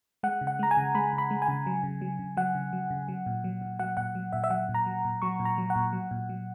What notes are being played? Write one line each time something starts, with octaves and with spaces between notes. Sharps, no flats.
G#3 F#5
C#3
F#5
G#3 A#5
G#5
C#3
G#3 B5
C#3
B5
G#3
G#5
C#3
F#3
C#3
F#3
C#3
F#3 F#5
C#3
F#3
C#3
F#3
A#2
F#3
A#2
F#3 F#5
A#2 F#5
F#3
A#2 E5
E5
F#3 F#5
A#2
A#5
F#3
A#2
F#3 C#6
A#2
A#5
F#3
F#5
A#2
F#3
A#2
F#3